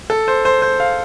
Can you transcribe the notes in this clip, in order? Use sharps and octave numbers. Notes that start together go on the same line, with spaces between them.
A4
C5
C5
C5
F5